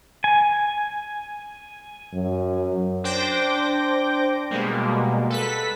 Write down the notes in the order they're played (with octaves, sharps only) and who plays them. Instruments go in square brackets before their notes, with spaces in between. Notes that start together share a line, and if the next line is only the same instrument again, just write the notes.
[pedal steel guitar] G#5
[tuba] F#2
[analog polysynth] D4 C5 G5 D6 G6 A#6
B2 G3 G#3 A#3
A4 B4 B6